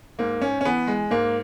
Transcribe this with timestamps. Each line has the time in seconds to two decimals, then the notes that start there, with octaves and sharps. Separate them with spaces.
0.19 G#2 A#3
0.41 C#4
0.61 C#4
0.66 E3 B3
0.87 G#3
1.11 G#2 A#3